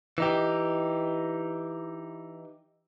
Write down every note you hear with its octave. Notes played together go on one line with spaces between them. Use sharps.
E3 D#4 G4